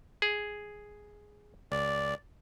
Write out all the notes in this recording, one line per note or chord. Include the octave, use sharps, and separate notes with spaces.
G#4
C#2 D5